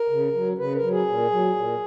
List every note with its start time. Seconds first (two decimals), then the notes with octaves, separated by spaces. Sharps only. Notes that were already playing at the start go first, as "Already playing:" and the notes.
Already playing: A#4
0.09 C#3
0.34 F#3
0.58 C#3 B4
0.74 A#4
0.83 F#3
0.91 G#4
1.08 A#2
1.31 F#3
1.56 A#2